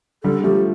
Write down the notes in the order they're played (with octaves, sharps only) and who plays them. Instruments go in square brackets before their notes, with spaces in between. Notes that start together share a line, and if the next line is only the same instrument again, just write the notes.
[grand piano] D3 G3 [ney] A4
[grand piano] F3 A3 [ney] G4